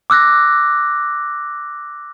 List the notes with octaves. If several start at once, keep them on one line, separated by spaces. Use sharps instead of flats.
D6 E6 F#6 A#6